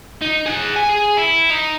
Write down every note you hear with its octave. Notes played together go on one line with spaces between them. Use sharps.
D#4
G#4 F#5
G#5
G#4
E4
D#4